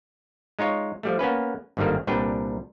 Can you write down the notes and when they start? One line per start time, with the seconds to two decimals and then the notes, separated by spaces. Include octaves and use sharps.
0.59 G#3 D#4 F4 C#5
1.03 F3 G3 A3
1.19 A#3 B3 C#4 B4
1.77 G#1 G2 D3 D#3 G3 A#3
2.07 C2 A#2 G3 D4 B4 G5